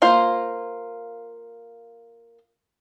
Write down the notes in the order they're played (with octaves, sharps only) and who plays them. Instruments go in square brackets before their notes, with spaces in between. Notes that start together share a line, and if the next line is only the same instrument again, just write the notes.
[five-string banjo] A#3 F4 C5